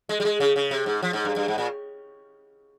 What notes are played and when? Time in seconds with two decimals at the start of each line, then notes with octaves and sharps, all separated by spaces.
0.09 G#3
0.20 G3
0.25 G#3
0.40 C#3
0.56 C#3
0.71 C3
0.86 G#2
1.02 F3
1.13 G#2
1.25 G2
1.36 G2
1.48 G#2
1.58 A#2